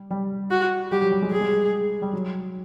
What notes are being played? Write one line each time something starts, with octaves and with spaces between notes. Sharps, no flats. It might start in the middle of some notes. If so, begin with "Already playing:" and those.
Already playing: G3
G3
F#4
G3 G4
F#3
G3
F#3 G#3
G3 G#4
G#3
G3
G3
F#3